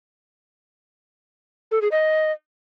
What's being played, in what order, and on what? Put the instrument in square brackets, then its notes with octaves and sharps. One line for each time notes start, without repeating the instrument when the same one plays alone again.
[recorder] A4
G#4
D#5